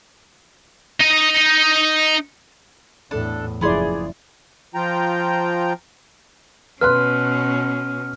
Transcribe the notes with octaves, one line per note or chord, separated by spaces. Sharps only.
D#4 D#5
E2 A2 D4 A4
F#1 F3 B3 E4 G#4 D5 C6
F3 F4 G5 A#5
B2 C#4 B4 C6 F6 F#6